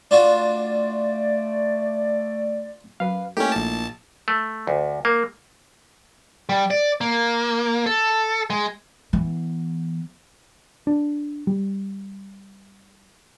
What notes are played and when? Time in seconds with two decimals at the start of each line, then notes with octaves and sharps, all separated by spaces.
0.11 A3 D4 F4 F#4 D5
3.00 F#2 B4 F5
3.37 A3 A#3 C#4 D#4 E4 G4
3.52 A#1 A5
4.28 A3
4.67 D2
5.05 A#3
6.49 G3
6.71 D5
7.01 A#3
7.86 A4
8.50 G#3
9.13 E3 B3
10.87 D4
11.47 G3